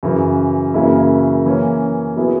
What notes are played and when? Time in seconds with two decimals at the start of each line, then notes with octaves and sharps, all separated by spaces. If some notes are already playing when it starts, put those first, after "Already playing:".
0.03 F#2 C#3 E3
0.74 F#2 C#3 E3 A#3 E4
1.46 E3 A#3 C#4
2.16 F#3 B3 E4 G#4 B4